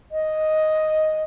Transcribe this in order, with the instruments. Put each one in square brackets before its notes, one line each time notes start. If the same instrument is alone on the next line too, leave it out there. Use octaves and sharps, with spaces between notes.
[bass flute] D#5